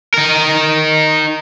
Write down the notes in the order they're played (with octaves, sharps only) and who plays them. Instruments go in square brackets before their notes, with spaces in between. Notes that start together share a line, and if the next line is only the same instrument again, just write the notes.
[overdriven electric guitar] D#4 A#4